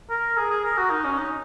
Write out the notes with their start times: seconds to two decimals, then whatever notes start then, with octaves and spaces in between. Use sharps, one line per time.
0.10 A#4
0.37 G#4
0.50 G#4
0.64 A#4
0.78 F#4
0.90 D#4
1.04 C#4
1.18 D#4